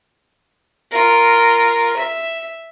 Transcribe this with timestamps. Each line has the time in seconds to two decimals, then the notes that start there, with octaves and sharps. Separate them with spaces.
0.92 F4 A#4
1.97 E5